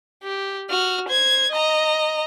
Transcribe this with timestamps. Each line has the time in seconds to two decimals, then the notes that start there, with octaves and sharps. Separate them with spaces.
0.23 G4
0.70 F#4 F6
1.09 C5 G#6
1.51 D#5 A#5